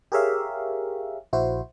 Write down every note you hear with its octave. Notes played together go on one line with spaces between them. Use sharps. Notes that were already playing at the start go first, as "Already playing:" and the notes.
G4 G#4 A#4 C#5 E5 F5
A#1 E4 F#4 C5